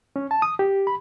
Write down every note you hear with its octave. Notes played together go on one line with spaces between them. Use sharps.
C#4
A5
D#6
G4
B5